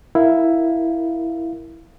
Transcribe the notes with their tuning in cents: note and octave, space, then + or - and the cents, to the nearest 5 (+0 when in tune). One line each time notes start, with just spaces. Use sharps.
E4 +0 A#4 +0 F5 +0